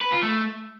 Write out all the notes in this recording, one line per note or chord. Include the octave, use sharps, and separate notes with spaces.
B4
F4
A3